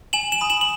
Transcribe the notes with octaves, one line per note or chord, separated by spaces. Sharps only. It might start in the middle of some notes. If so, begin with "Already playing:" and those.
G#5 E7 F#7
E7 F#7
B5 D#6
E7 F#7
F#7